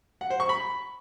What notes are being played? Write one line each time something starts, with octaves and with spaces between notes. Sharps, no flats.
F#5
C5
C#6
B5